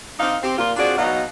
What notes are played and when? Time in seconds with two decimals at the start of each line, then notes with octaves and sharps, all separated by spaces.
0.19 C4 D4 D#4 F5
0.42 C4 G4
0.58 A#2 F4
0.76 C4 D4 F4 F#4 G#4 D5
0.97 B2 F#3 D#4 D#5 F5 F#5